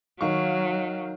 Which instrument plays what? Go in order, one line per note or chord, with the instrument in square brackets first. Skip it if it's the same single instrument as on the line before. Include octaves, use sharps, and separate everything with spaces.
[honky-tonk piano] D#3 F5 C#6 [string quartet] F#3